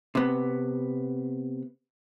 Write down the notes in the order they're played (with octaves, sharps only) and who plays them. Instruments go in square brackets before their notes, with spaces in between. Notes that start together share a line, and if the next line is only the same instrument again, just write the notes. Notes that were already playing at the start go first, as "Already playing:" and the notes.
[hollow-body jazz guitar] C3 B3